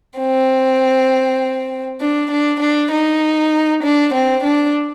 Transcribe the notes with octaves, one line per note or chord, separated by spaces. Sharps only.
C4
D4
D4
D4
D#4
D4
C4
D4